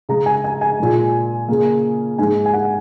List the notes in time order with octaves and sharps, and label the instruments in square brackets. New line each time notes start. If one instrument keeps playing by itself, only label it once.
[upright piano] C#3 G#3 A#5
G#5
G#5
G#5
A#2 G#3
C#3 A#3
G#2 G#3 G#5
G#5
F#5